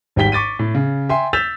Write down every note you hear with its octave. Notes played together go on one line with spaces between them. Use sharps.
G#1 G#2 G3 G5 B6 G7
C#6 D6 A6 B6 D#7
A2
C#3
E5 G5 G#5 C6
E6 G6 A6 B6 E7 F7